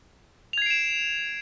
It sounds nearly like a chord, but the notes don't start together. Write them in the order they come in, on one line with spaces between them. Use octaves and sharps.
F7 G#6 C7 D7 E7